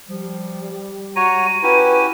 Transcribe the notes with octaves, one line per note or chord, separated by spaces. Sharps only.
F3 G3
F#4 C#5 A#5 D#7
C#4 E4 F#4 G4 B4